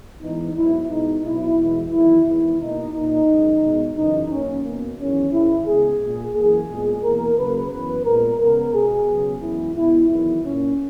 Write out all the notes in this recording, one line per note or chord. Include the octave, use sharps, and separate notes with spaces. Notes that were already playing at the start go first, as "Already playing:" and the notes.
G#2 E3 B3 D#4
G#2 F#3 B3 E4
B2 G#3 B3 D#4
B2 F#3 B3 E4
E2 B2 G#3 B3
E2 D#3 F#3 E4
E2 D#3 G#3 B3 E4
B2 A#3 D#4
A#2 A#3 D#4
F#2 D#3 G#3
B2 G#3 B3
F#2 C#3 E3 D#4
F#2 D#3 A#3 C#4
B2 A#3
E2 D#3 F#3 C#4
G#2 D#3 G#3 E4
C#3 G#3 B3 G#4
A#2 A#3
F#2 E3 A#3 G#4
A#2 G#3 B3
E2 B2 A#3 A#4
C#3 F#3 A#3 B4
F#2 E3 B3 B4
A#2 G#3 B3 A#4
C#3 G#3 B3 A#4
B2 G#3 B3 G#4
C#3 F#3 B3
F#2 E3 G#3 B3 E4
B2 G#3 B3 E4
E2 D#3 F#3 B3 E4
A#2 A#3 C#4